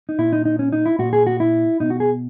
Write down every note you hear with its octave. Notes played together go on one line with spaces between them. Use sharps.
D#4
A#2 E4
D#4
D#4
C#4
D#4
E4
A#2 F#4
G#4
F#4
E4
B2 D#4
F#4
G#4